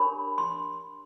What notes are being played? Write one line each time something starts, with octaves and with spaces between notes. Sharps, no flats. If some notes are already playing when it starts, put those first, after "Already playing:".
Already playing: D4 G4 A#4 C#5 B5
C6